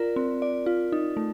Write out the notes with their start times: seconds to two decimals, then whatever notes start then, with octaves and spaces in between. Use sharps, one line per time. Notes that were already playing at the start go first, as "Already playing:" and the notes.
Already playing: F4 A#4 D5
0.16 C4
0.42 D5
0.66 F4
0.92 D#4
1.17 A3